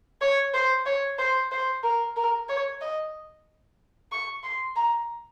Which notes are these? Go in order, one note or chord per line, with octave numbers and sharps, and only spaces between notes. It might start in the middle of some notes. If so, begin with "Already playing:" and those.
C#5
C5
C#5
C5
C5
A#4
A#4
C#5
D#5
C#6
C6
A#5